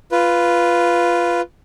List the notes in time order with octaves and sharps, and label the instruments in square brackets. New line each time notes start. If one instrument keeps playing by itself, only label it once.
[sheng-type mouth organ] F4 B4